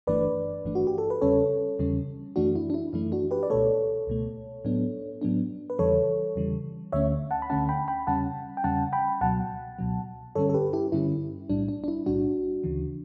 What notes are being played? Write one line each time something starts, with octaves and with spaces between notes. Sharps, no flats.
G1 G2 E3 A3 D4 B4 D5
G1 G2 E3 A3 D4
F#4
G4
A4
B4
E2 C#3 G3 C#4 A4 C#5
E2 C#3 G3 C#4
F#2 E3 A3 D4 F#4
E4
D4
E4
F#2 E3 A3 E4
D4 F#4
G4 B4
D5
C#2 B2 A3 A4 C#5
C#2 B2 A3
A2 F#3 B3 D4
A2 F#3 B3 D4
B4
E2 C#3 E3 G3 A4 C#5
E2 C#3 E3 G3
D2 D3 A3 C#4 C#5 E5
F#5 A5
B5
D2 D3 A3 C#4 F#5 A5
G5 B5
G5 B5
E2 C#3 G3 C#4 F#5 A5
G5
E2 C#3 G3 C#4 F#5 A5
G5 B5
C#2 B2 F#3 F#5 A5
C#2 B2 F#3
G2 D3 G3 C#4 A4 C#5
A4
G4 B4
E4 G4
G2 D3 G3 C#4 E4
B1 A2 G3 D4
D4
D4
E4
B1 A2 G3 D4 F#4
D2 C#3 E3